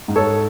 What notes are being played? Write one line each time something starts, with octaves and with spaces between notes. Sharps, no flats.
G#2
A4 C#5